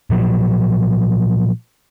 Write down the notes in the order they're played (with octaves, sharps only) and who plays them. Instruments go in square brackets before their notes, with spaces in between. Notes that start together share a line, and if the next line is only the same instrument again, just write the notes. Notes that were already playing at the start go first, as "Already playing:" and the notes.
[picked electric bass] A#2 F3 F#3